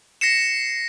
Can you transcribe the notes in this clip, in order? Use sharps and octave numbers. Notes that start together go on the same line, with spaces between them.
A#6 C7 C#7 E7